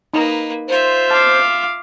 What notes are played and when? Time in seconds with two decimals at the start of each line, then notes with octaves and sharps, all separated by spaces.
0.14 A#3 D#4 B4 D#5 A#5
0.68 F4 C5 E5
1.11 F5 A5 D6